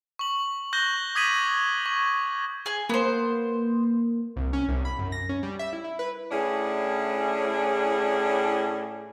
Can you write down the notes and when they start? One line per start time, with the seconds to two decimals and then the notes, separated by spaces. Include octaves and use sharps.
0.19 C#6 F#7
0.73 C#6 F#6 G6 A#6 G7
1.15 D6 D#6 G#6 B6 D#7 F#7
1.86 C#6
2.66 G#4 G#5
2.89 A#3 B3 C5
4.36 C2
4.53 C#4
4.68 C2
4.85 B5
4.99 F#2
5.12 A#6
5.29 C#4
5.43 G3
5.59 E5
5.73 E4
5.84 E4
5.99 B4
6.31 A2 C#4 D4 E4 G#4